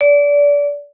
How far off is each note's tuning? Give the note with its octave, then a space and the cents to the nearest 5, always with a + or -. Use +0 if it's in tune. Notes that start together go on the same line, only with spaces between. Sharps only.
D5 -25